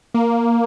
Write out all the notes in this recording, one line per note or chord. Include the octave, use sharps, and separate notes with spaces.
A#3